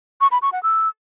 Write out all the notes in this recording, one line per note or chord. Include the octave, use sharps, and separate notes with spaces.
C#6
B5
C#6
F#5
E6